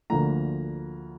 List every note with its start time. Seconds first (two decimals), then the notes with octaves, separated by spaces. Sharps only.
0.10 D2 D3 F3 A#3 A#5